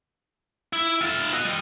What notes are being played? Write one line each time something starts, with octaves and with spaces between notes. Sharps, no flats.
E4
F4 E5
F#4 D#5
G3 D#5